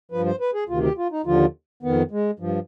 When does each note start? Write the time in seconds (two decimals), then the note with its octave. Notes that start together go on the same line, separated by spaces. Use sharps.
0.11 G2 F3 B4
0.26 C5
0.41 B4
0.54 G#4
0.69 D2 C3 D#3 F4
0.83 G4
0.98 F4
1.12 D#4
1.25 D#2 D3 F3 F4
1.83 F2 D#3 B3
2.11 G#3
2.39 G2 F3